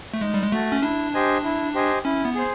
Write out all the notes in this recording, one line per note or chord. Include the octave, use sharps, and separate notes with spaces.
A3
G#3 D#4
G3
G#3
A3 F#4 A4
C#4
D4 E4
G4 C5 D#5 G#5
E4
G4 C5 D#5 G#5
C#4 E4
B3
G#4 C5